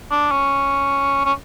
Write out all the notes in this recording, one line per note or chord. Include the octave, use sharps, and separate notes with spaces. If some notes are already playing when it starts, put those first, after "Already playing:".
D4
C#4
C#4